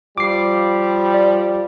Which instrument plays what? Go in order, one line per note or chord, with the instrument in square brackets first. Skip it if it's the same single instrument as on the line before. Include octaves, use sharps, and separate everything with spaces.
[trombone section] F3 G3 [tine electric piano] D6 C7
[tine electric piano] D5